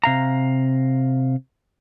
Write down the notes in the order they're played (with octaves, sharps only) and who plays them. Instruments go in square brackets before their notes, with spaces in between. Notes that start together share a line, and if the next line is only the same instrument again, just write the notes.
[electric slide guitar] C3 F5 A#5